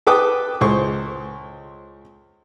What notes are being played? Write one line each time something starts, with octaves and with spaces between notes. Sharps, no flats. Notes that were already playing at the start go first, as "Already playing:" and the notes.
A4 B4 G5 D6 D#6
C#2 C5 C#6